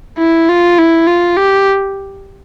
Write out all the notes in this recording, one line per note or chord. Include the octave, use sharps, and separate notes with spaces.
E4
F4
E4
F4
G4